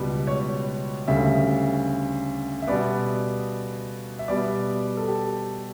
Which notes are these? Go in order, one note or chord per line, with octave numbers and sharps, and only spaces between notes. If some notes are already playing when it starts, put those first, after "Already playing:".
Already playing: C#2 B2 G3 B3 D5
C#5
D2 C#3 G3 E5
E5
B2 G3 B3 D5
E5
B2 G3 B3 D5
A4
G4